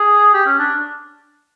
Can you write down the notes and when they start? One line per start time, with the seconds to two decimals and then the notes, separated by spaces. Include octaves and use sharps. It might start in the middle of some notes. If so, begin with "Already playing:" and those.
Already playing: G#4
0.34 G4
0.46 C#4
0.59 D4